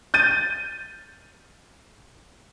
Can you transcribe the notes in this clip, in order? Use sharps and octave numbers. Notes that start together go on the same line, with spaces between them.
G6 A6 D#7